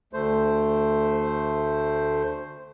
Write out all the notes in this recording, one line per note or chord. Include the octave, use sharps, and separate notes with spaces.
D2 A3 C5